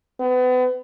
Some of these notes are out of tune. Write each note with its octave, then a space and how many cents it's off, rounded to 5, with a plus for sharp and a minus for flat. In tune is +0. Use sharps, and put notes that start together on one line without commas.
B3 +35